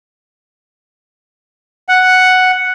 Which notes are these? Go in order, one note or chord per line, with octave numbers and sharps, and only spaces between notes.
F#5